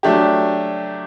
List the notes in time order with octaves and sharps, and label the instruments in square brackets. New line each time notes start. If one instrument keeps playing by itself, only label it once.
[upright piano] F#3 A3 D4 G4